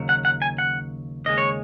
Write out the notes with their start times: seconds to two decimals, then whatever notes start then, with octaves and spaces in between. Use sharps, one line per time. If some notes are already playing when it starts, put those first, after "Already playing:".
Already playing: D#2 C#3 F#3
0.09 F#5
0.25 F#5
0.42 G#5
0.58 F#5
1.25 D#2 C#3 G#3 D#5
1.38 C#5